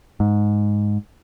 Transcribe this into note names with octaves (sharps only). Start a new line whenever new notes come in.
G#2